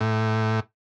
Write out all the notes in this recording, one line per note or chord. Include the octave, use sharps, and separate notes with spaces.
A2